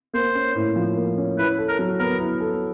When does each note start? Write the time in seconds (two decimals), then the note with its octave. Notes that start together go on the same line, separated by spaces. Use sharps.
0.14 A#3 C5
0.35 C#4
0.55 A2
0.76 F3
0.96 A#3
1.17 C#4
1.37 E4 B4
1.58 A4
1.68 A#4
1.79 F#3
1.99 B3 A#4
2.20 E4
2.40 A4